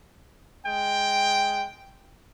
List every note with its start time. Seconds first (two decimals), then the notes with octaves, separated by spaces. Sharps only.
0.66 G#3 G5